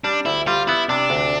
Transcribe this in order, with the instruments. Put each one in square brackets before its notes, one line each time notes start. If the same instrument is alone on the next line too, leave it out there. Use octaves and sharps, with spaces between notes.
[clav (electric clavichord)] G3 [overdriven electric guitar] D4
[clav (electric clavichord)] D2 [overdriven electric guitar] E4
[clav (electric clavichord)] G3 [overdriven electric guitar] F4
[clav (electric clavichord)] B3 [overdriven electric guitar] E4
[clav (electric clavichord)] C3 [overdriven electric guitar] D4
[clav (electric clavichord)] D2